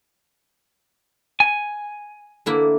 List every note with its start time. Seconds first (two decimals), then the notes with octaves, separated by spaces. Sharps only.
1.40 G#5
2.46 D3 A#3 E4